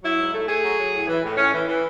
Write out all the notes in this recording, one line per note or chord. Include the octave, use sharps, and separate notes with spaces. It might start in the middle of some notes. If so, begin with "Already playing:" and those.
F#3 E4
G#2
A3
A3 G#4
F#3
F#3
A2
E3
A2
A2 C#4
E3
E3